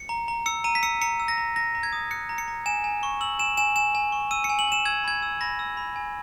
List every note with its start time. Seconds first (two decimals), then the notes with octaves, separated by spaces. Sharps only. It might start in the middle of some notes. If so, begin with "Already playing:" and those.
Already playing: C#7
0.09 A#5
0.28 A#5
0.46 E6 C#7
0.64 A#5 D#7
0.75 B6
0.83 E6 C#7
1.01 A#5 C#7
1.20 E6
1.28 A#6
1.38 A#5
1.56 A#5 A#6
1.75 A#5
1.83 G#6
1.93 D#6
2.11 F#6 C#7
2.29 A#5
2.38 C#7
2.48 A#5
2.66 G#5 E7
2.84 G#5
3.03 C#6
3.21 E6 F#7
3.39 G#5 E7
3.57 G#5 E7
3.76 G#5 E7
3.95 G#5
4.12 C#6
4.31 E6 D#7
4.44 C#7
4.49 G#5
4.59 F#7
4.68 G#5 E7
4.86 E6 G#6
5.04 B5 G#6
5.23 E6
5.41 B5 A#6
5.59 E6
5.77 B5
5.96 G#5